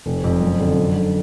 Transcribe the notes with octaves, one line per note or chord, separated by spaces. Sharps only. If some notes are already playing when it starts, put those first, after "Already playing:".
F1
F2
F#2
D3
F#2
D3